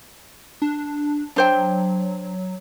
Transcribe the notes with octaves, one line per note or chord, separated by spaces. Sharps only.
D4
F#3 D4 C5 G5